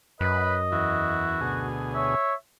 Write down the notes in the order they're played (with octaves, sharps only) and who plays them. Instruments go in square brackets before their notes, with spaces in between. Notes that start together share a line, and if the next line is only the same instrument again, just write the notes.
[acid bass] F#2 [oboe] B4 [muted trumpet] D#5 [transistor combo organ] B5
[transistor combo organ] E2 E4 [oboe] F#4
[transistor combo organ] D2 B2 G#4
[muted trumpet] C#5 [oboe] E5